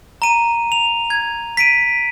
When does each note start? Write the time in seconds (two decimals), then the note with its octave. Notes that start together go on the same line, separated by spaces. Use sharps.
0.22 A#5 D#7
0.72 F7
1.10 G#6
1.57 B6 D7 D#7